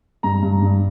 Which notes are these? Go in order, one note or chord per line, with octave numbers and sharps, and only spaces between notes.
G2 A#5
G2
G2